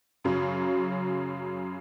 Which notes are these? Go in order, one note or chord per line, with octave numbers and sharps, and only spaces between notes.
F#2 C#3 F#3